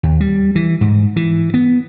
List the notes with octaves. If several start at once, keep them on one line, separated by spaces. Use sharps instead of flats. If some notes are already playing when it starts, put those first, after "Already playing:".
D#2
G3
E3
G#2
E3
B3